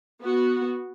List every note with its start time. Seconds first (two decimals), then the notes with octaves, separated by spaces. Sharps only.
0.23 B3 F#4